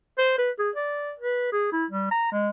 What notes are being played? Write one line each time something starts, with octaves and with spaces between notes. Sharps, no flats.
C5
B4
G#4
D5
B4
G#4
E4
G3
A#5
G#3